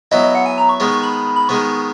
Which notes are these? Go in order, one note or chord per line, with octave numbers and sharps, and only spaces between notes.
F#3 B3 E4 D#5
D#5
F#5
G#5
A#5
C#6
D#3 G#3 B3 C#6
C#6
B5
B5
D#3 G#3 B3 C#6